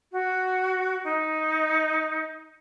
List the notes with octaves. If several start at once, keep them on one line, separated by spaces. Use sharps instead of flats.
F#4
D#4